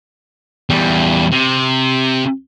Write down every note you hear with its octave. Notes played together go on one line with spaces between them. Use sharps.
E2 G3
C3